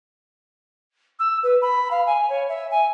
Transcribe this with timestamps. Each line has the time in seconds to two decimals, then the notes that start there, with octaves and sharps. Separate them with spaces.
1.19 E6
1.43 B4
1.62 B5
1.91 F5
2.06 G#5
2.29 C#5
2.49 E5
2.71 G#5